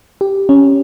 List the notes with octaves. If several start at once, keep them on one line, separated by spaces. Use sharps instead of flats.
G4
C#4